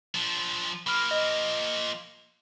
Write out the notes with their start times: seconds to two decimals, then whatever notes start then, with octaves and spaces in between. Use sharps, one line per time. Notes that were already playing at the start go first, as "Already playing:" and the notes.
0.15 F3 D4
0.87 F3 A#3 B5 F6
1.11 D#5